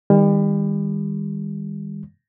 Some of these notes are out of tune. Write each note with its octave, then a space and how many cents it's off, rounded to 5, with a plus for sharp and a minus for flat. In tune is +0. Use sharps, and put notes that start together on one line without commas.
D#3 +10 G3 +40